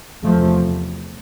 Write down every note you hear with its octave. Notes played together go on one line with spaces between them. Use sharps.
E2 C3 F3 A3